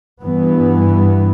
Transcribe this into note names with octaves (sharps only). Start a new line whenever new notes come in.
G2 E3 B3